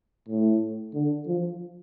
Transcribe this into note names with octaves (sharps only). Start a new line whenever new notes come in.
A2
D3
F3